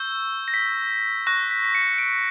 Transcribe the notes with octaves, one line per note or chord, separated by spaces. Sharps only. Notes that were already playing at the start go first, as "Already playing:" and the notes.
Already playing: C#6 E6 G6
A#6
B6
C#6 F#6 A#6
B6
B6
C#7
D7